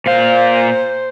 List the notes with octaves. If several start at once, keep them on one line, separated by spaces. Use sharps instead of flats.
A#2 C5 F5